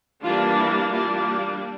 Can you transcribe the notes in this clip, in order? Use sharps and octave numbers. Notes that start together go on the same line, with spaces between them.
E3 G3 A#3 D4 F4
E4
G3 A#3 D4 F4